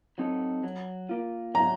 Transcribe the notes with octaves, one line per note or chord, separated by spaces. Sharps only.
F#3 C4 D#4 A4
F#3
A#3 F4
F#3 A#5